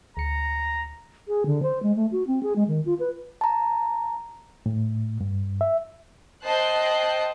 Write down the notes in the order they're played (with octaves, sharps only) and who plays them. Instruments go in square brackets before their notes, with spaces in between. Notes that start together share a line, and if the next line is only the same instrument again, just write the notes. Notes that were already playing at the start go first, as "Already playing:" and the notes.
[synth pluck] D2 C#7 [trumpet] A#5
[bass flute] G#4
D3
C5
G#3
A3
F#4
C4
G#4
G#3
D#3
F4
B4
[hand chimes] A5 A#5
[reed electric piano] A2
G2
E5
[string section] C5 D#5 G5 A5 F#6 C7